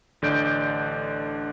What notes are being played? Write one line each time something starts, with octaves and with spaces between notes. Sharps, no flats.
A1 D3 D5 G6 D7